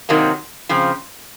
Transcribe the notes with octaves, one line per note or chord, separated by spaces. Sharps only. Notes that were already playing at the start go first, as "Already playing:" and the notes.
C3 D#3 F#3 A#3
C#3 F3 C4